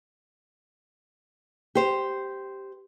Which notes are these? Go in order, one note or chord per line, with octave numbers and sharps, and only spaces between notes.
G4 C5